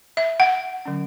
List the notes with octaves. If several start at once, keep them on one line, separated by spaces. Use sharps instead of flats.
E5
F#5
D3 F#3 C#4